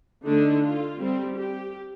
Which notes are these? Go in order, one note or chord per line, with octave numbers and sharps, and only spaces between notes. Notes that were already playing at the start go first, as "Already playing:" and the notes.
D3 A3 D4 D#4
F4
G3 C4
G4